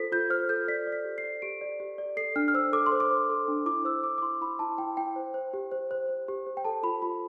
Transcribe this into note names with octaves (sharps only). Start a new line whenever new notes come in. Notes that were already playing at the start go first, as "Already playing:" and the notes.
Already playing: F4 A4 C5 B6
F4 G6
C5 F6
A4 G6
D5 B6
D5
B6
G4
C7
D5
G4 D7
D5
G4
D5
A4 C7
D4 F6
F6
C5 E6
A4 D6
C6
C5
D6
C5
A4
D4
E4 D6
C5 E6
C5 D6
D6
E4 C6
E4 B5
E4 A5
E4 G5
E4 G5
C5
C5
G4
C5
C5
C5
G4
C5
G5
A4 A5
F4 B5
F4 B5